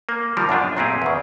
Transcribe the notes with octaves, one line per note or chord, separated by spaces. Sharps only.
A#3
D#3 F3 G3 A#4
F#2 B2 D4 F4
A#2 A3 C4 E4 G4 G#4
E2 C#3